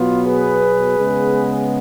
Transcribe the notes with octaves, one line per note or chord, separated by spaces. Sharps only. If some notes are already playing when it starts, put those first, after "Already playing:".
Already playing: B2 F#3 B3 F4
G#4 B4
C#3 G#3 B3